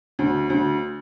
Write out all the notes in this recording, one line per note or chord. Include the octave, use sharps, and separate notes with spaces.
D2
D2